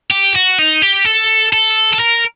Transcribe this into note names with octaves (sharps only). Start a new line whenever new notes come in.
G4
F#4
D#4
G4
A4
A4
A4
A#4